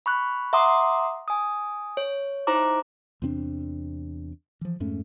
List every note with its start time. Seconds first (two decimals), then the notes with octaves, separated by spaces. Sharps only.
0.06 B5 C#6 F#6
0.53 E5 F#5 A#5 C6 D6 D#6
1.28 G#5 D#6
1.97 C#5
2.47 D#4 E4 C5 A#5 D6
3.22 E2 C3 C4 D4
4.61 E3 F3
4.80 F2 G#2 A3 C#4